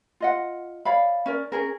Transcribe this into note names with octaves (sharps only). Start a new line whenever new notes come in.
F4 D#5 F#5
C#5 D5 F5 B5
C#4 A#4 D5
C#4 G#4 A#4